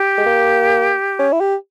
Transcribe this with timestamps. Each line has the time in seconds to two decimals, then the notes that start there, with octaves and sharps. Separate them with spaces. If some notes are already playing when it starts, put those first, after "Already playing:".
Already playing: G4
0.18 G#3
0.26 A#3
1.19 C#4
1.32 E4
1.40 G4